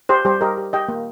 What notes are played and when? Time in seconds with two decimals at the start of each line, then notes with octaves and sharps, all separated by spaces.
0.09 G4 C5
0.25 G3 G4 C5
0.41 G4 A#4 D#5
0.57 G4
0.73 G4 D#5 G5
0.89 A#3